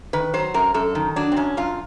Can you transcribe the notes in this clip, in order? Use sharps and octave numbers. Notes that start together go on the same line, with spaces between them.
D#3 B4
F#3 C5
F#2 A#4
F#2 A4
D#3
F#3 D4
C4
F#2 C#4
F#2 F4